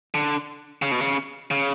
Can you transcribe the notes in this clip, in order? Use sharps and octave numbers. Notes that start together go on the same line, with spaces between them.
D3
C#3
B2
C#3
C#3